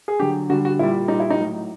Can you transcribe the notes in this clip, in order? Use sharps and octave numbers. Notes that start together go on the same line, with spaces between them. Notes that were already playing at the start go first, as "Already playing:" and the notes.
G#4
D3 F#3 G4
D3 G3 F#4
F#4
A#2 G3 E4
A#2 G3 D#4
E4
D#4
A2 F#3